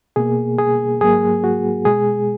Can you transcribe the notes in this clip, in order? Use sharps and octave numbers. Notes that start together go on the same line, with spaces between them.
B2 A#3 G#4
G#4
G#2 F#3 A#3 G#4
F#4
B2 G#3 G#4